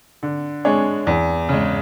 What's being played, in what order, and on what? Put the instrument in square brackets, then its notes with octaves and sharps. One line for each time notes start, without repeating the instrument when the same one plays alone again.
[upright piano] D3
G#3 D4 G#4 C#5
E2
C#3 G#3